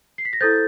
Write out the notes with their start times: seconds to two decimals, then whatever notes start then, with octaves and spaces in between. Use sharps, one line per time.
0.18 C7
0.25 B6
0.33 A#6
0.41 E4 A4 C5 G6 A6